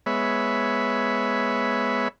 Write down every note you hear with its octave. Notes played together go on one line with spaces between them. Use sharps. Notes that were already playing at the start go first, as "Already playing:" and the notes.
G#3 B3 C#5 E5 B5